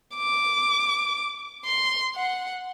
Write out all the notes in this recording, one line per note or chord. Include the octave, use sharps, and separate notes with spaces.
D6
C6
F#5